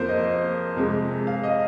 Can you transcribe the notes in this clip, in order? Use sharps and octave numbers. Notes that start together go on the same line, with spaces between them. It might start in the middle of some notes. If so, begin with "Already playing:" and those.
Already playing: F2 F3 A#3 A#4 C5
D#5
F2 C3 G#3
F5
D#5